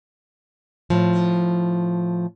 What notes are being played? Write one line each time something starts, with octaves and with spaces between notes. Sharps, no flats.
A2 F3